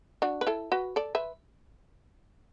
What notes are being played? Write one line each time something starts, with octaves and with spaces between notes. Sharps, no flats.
D4 F#4
B4
E4 A4
F#4 B4
A4 D5
B4 E5